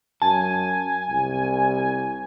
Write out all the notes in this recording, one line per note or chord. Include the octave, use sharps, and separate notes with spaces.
F#2 G#5 A5
C2